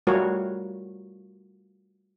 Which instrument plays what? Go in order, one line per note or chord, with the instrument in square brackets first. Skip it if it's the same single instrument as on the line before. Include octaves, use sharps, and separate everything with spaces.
[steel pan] G3 A3 F4 F#4 A#4 C#5